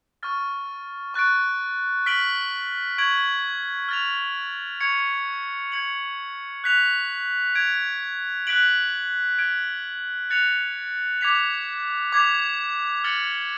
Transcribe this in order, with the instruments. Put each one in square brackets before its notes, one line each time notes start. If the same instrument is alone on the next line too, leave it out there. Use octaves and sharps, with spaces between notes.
[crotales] C#6 F6 A6
C#6 F#6 A6 D7
F6 B6 D7 F#7
C#6 G#6 D7 F#7
F6 A6 F7
C#6 G#6 C#7 F7
G#6 C#7 F#7
F#6 B6 F7
G#6 D7 F7
F#6 B6 D7 F#7
F6 G#6 D7
F#6 A6 C#7 F7
D6 G#6 B6 F7
D6 G#6 B6 F7
F6 A6 C#7 F#7